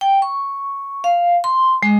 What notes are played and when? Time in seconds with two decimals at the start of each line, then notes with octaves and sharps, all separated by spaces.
0.01 G5
0.22 C#6
1.04 F5
1.44 C6
1.83 G#3